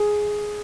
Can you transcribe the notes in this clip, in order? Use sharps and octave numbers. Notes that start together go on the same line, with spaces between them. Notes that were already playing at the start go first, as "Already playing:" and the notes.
Already playing: G#4